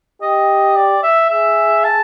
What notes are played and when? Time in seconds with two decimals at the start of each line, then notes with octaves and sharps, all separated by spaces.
0.22 G4 D#5
0.76 D5
1.03 E5
1.30 G#4 E5
1.84 A5